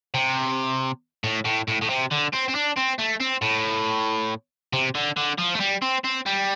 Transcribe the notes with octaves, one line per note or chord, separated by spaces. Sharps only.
C3
A2
A2
A2
A2
C3
D3
C4
C4
D4
C4
A3
C4
A2
C3
D3
D3
F3
A3
G3
C4
C4
G3